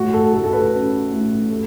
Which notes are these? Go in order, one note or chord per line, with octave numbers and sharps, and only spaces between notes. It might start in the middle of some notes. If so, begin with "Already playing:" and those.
Already playing: A2 F#4
A4
A1 A4
A4
B4
C#4
A2
A3